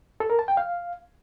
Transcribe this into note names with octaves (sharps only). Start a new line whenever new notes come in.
A4
A#4
A5
G5
F5